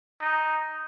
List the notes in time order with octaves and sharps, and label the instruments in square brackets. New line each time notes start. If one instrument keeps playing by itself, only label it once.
[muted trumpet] D#4